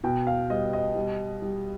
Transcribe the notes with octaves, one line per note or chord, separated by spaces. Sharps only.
B2 G5
F5
G3 D#5
D#5
G3
G3